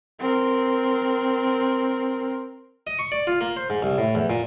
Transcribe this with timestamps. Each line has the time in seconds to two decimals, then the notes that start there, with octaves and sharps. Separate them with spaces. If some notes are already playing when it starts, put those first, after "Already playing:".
0.19 C4 A#4
2.87 D#5
2.99 C#6
3.12 D5
3.27 F4
3.41 A#3
3.57 C5
3.70 G#2
3.82 C2
3.98 A2
4.15 E2
4.30 A#2